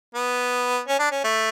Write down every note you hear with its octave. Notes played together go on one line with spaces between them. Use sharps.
B3
C#4
D4
C#4
A3